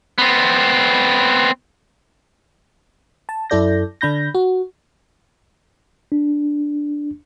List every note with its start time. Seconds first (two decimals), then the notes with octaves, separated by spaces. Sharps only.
0.18 B3 C4
3.29 A5
3.50 F#2 E4 A4 D5 G6 A#6
4.01 D3 D4 B5 G6 A#6
4.35 F#4
6.12 D4